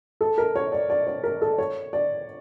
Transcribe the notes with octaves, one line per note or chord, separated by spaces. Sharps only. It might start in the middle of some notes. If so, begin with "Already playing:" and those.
A4
A#4
C#5
D5
D5
C#5
A#4
A4
C#5
D5